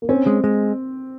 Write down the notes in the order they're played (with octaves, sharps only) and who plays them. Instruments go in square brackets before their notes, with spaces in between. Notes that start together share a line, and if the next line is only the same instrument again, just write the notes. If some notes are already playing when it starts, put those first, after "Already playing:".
[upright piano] A#3
[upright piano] C4 [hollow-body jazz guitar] C#4
[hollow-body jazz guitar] G#3
G#3